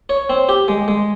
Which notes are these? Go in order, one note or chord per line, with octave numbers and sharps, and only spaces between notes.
C#5
C4
G4
G#3
G#3